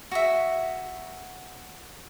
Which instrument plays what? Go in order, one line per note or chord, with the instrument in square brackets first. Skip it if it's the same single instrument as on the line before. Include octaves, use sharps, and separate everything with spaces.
[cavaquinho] F#4 G#4 E5